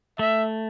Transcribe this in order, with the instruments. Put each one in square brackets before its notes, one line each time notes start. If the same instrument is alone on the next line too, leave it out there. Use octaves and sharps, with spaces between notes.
[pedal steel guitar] A3 [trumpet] E5